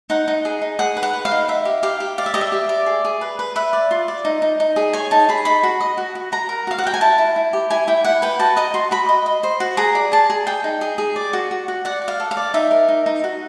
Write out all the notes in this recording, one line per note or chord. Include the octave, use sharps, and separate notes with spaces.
D#4 F#5
D#4
G#4
D#4
G#4 F#5
B4
F#5
B4
F5
D#4
D#4 E5
G4
G4 F5
G4
D5 F5
E5
G4 D#5
E5
G4
D5
G#4
G#4
B4
B4
B4 E5
D5
F4
D5
D#4
D#4
D#4
G#4
C#5 G#5
D#4 A5
G#4 B5
D#4 B5
F#4
D#5
F#4
F#4
F#4 A#5
A#4
F#4 F5
F#5
F#4 G5
G#5
E4 A5
E4
E4
G4
E4 G#5
E4 G5
E4 F#5
B4 G5
F#4 A5
D#5 A#5
F#4 C6
F#4 B5
D#5
D#5
C5
F#4
G#4 A#5
D5
G#4 A5
G#4
G#4 G5
D#4
G#4
G#4
D5
F#4
F#4
F#4
D5 F#5
D5
F5
A4
F5
D5
D#4 E5
A#4
D#4
D#4
F#4